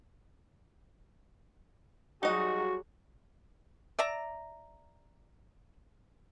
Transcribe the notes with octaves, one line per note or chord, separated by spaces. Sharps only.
F#3 G3 D#4 F#4 G#4 D#5
D5 E5 A#5